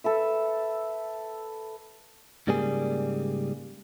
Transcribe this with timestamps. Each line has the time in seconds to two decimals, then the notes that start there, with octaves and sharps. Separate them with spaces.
0.04 A4 B4 E5
2.47 G#2 C#3 G3 A#3 G#4 D5